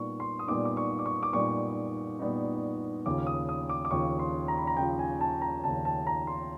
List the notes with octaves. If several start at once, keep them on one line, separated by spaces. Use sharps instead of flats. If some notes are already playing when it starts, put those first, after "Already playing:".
Already playing: A#2 G3 B3 D#4 C#6
C6
D#6
A#2 G3 B3 D#4 D6
D6
C#6
D6
C#6
D6
A#2 G3 B3 D#4 C#6
A#2 G3 B3 D#4
D#2 C#3 F3 D6
D#6
D#6
D6
D6
D#2 C#3 F3 C#6
C6
A#5
B5
A#5
D#2 C#3 F3 G5
G#5
A5
A#5
D#2 C#3 F3 A5
A5
A#5
C6